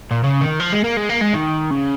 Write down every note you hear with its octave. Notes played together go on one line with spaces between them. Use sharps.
A#2
C#3
D#3
F3
G#3
A#3
G#3
A#3
G#3
D#3
C#3